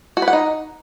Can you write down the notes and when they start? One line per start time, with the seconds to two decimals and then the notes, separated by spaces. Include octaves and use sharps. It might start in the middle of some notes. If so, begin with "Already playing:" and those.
0.17 F#4
0.22 B4
0.28 F#5
0.33 D#4